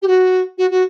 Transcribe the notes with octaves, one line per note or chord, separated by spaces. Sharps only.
G4
F#4
F#4
F#4